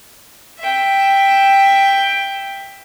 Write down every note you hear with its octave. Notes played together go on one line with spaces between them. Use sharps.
E5 G5